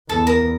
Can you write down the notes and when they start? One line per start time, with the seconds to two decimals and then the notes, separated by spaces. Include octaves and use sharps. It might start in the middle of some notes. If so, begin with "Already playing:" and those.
0.09 E2 A4
0.27 A#4